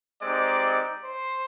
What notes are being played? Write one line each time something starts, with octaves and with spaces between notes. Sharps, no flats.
G#3 C4 D#4 G4 D5
C5